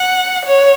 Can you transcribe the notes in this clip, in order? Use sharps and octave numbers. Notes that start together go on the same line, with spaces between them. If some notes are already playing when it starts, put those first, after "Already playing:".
Already playing: F#5
C#5